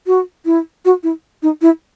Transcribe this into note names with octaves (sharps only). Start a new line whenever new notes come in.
F#4
E4
F#4
E4
D#4
E4